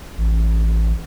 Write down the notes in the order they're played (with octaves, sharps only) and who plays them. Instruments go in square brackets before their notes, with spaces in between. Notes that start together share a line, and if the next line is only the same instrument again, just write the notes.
[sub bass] A1